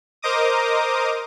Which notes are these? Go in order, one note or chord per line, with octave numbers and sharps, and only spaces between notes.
A#4 C5 D#5 A#5 D6 D#6